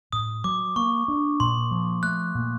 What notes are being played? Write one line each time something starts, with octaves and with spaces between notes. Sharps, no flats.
A2 D#6
F#3 D6
A#3 C#6
D4
A#2 C6
F3
A3 F#6
A#2